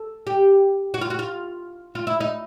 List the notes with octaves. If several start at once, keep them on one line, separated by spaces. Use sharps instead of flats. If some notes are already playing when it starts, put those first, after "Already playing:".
Already playing: A4
G4
F#4
F4
F#4
F4
F4
E4
D#4